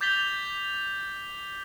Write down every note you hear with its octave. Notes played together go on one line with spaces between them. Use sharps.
D6 G6 A6 B6 F7 G7